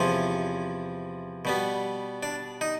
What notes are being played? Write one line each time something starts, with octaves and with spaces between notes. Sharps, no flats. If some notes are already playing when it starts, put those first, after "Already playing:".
Already playing: E2 C3 F3 C#4
B2 G3 B3
D4
D#4